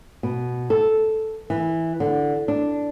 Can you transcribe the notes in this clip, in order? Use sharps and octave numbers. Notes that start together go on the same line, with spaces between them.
B2
A4
E3
D3
D4